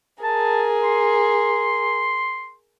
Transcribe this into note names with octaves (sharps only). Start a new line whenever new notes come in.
G#4 A#4 A5
C6